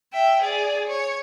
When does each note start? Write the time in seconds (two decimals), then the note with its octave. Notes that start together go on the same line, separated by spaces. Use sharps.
0.13 E5 G5
0.42 G#4 D5
0.88 C#5